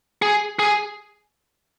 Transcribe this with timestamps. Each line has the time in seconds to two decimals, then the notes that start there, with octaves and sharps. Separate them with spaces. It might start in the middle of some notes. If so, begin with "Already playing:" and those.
0.22 G#4
0.59 G#4